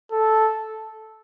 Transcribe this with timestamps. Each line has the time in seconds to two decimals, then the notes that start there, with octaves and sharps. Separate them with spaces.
0.12 A4